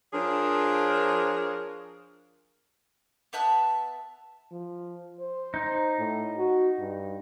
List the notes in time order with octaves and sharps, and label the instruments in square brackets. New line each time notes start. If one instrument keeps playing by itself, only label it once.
[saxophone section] F3 D4 F4 G#4 A#4 C#5
[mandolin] B3 E5 A5 F#6
[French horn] F3
C5
[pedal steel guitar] D#4
[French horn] A2
F#4
G2